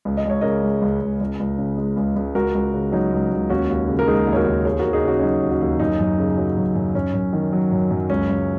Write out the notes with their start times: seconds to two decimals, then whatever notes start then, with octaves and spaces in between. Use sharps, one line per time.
0.05 C#2
0.17 D#5
0.25 C#2 C#5
0.41 C#3 A#4 D#5
0.63 G#3
0.82 C#2
1.01 C#2
1.20 C#2
1.40 C#2
1.58 C#3
1.78 G#3
1.97 C#2
2.16 C#2
2.35 C#2 F#4 A#4
2.55 C#2
2.74 C#3
2.92 F#3 D#4
3.12 C#2
3.31 C#2
3.50 D#2 C#4 F#4
3.69 D#2
3.88 C#3
3.99 A#4
4.07 G#3 D#4 G#4
4.27 D#2
4.33 C#5
4.36 F#4 A#4
4.46 D#2
4.65 D#2 G#4 C#5
4.79 F#4 A#4
4.84 D#2
4.93 D#4 G#4
5.03 C#3 C#4 F#4
5.17 C#4
5.22 F#3 D#4
5.42 D#2
5.51 C#4 F#4
5.61 D#2
5.80 F#2 D#4
5.99 F#2
6.19 C#3
6.37 F#3
6.57 F#2
6.75 F#2
6.95 F#2 C#4
7.14 F#2
7.33 D#3
7.53 F#3
7.72 F#2
7.90 F#2
8.10 C#2 C#4
8.29 C#2